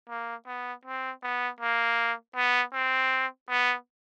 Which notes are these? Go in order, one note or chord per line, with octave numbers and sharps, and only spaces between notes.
A#3
B3
C4
B3
A#3
B3
C4
B3